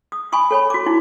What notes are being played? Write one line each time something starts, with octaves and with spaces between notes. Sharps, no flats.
D#6
G#5 B5 C#6 D#6
A4 C#5 G#5 B5
F#4 D6
D#4 E4